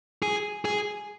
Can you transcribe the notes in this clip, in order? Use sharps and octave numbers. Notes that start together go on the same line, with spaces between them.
G#4
G#4